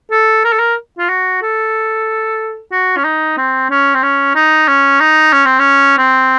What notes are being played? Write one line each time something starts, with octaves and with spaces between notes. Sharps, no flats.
A4
A#4
A4
A#4
F4
F#4
A4
F#4
C#4
D#4
C4
C#4
C4
C#4
D#4
C#4
D#4
C#4
C4
C#4
C4